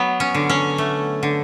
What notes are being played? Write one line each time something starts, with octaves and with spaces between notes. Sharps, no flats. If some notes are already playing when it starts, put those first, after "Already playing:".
Already playing: F#3 B3
C#4
D3
C#4
A3
D3